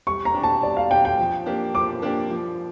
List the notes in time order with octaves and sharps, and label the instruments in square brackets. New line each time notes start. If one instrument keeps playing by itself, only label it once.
[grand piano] G3 [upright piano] C#6
[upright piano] A#5
[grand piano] D4 G4
[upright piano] A5
[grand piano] G3 [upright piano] D5
[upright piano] F5
[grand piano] D4 G4 [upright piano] G5
[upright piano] G5
[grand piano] F3
A#3 D4 G4
[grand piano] F3 [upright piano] D6
[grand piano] A#3 D4 G4
F3